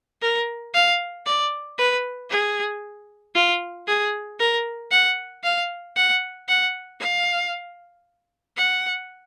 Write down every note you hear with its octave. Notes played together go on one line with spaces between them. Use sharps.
A#4
F5
D5
B4
G#4
F4
G#4
A#4
F#5
F5
F#5
F#5
F5
F#5